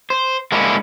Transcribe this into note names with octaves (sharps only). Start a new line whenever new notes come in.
C5
G#3 A#3 C#4 D4 E4